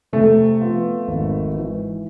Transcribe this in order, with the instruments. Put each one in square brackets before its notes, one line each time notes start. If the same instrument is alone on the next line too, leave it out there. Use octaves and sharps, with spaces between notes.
[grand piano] C3 [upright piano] A3
[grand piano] F3 B3 F4
G#1
G#2 E3